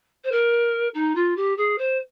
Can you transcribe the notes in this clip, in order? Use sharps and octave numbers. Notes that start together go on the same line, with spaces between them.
C5
A#4
D#4
F4
G4
G#4
C5